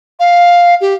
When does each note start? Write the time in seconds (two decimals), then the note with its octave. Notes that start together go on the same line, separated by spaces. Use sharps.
0.20 F5
0.81 G4